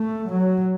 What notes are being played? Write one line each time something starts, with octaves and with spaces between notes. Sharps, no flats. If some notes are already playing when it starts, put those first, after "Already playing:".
Already playing: A3
F#3